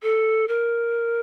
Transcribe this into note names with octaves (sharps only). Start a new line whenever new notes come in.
A4
A#4